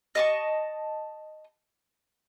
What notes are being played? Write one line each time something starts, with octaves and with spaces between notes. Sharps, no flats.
D#5 A5 C#6